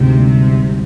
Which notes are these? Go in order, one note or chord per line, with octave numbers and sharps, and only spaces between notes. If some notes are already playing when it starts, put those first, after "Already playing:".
Already playing: D2 G#2 C3
G3